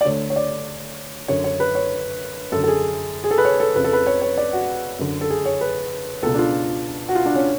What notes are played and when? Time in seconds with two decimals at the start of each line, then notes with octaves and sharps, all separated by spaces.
0.01 D5
0.05 D2 D3 C#5
0.30 C#5
0.36 D5
1.28 F#2 D3 C#5
1.44 C#5
1.60 B4
1.75 C#5
2.52 F#2 D3 A4
2.64 A4
2.68 G#4
3.24 G#4
3.31 A4
3.38 B4
3.45 C#5
3.60 A4
3.76 F2 C#3 B4
3.84 A4
3.93 B4
4.07 C#5
4.22 C#5
4.38 D5
4.53 F#4
4.99 F#2 D3
5.21 A4
5.30 G#4
5.45 C#5
5.61 B4
6.23 C#2 B2 A4
6.34 D4
6.38 F4
7.09 F#4
7.15 F4
7.25 D4
7.35 C#4